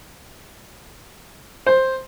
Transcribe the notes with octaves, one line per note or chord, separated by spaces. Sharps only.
C5